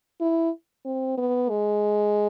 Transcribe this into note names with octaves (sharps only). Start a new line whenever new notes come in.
E4
C4
B3
G#3